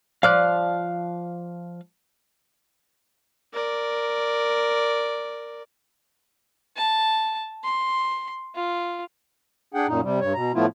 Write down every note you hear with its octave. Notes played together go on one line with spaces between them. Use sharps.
F3 D5 F5 F6 F#6
A#4 D5
A5
C6
F4
D4 G#4 F#5 G5
F#2 A#2 D#4
C3 G3
G2 C#5
B2 A#5
A2 F3 A3 B3 E4 F4